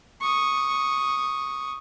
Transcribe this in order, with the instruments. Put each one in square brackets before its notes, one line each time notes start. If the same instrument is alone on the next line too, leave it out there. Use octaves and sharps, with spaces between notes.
[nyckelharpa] C#6 D#6